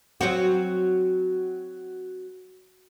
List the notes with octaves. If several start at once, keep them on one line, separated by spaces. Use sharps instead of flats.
F#3 C4 F#4